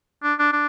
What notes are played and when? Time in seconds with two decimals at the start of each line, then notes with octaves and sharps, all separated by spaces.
0.23 D4
0.39 D4
0.53 D4